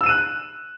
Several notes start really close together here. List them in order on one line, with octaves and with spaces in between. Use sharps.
E6 E7 D#7 F#6